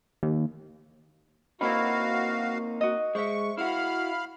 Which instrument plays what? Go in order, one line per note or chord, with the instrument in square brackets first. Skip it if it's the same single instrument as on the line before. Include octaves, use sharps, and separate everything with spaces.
[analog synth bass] D#2
[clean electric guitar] A#3 C4 D#4 [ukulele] E4 B5 [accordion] F#4 F5
[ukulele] F#4 D#5
[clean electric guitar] G#3 [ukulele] C5 E5 [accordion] C#6
[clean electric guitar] E4 F#4 [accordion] F5 B5 F6